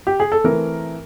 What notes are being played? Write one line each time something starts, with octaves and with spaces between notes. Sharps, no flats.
G4
G#4
A4
E3 A3 C4 A#4